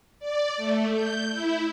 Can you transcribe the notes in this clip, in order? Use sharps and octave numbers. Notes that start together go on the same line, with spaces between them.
D5
A3
G6
E4